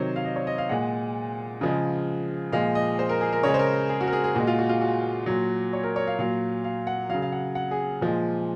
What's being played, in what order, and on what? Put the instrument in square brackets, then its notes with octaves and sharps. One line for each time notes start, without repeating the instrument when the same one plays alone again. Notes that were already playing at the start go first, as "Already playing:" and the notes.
Already playing: [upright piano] C3 D#3 F#3 C5 C#5
F5
D#5
C#5
D#5
F5
A#2 G#3 F#5
C#3 F3 G#3
A#2 F3 G#3 F5
D#5
C5
A#4
G#4
A#4
C#3 G#3 C#5
C5
A#4
G#4
F#4
A#4
G#4
G#4
A#2 G#3 F#4
F4
F#4
F4
F#4
A#2 F#3
C#5
A#4
C#5
F5
A#2 F#3 F5
F5
F#5
F#3 F5
C#3
F5
F#5
F#5
G#4
A#2 F3 G#3